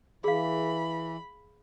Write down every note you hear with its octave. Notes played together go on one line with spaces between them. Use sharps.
E3 G#4 F5 B5